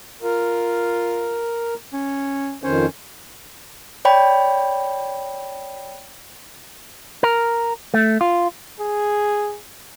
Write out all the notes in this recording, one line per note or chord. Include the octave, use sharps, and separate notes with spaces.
F4 A#4
C#4
F2 D#3 C#4 C5
C#5 D5 G5 B5
A#4
A3
F4
G#4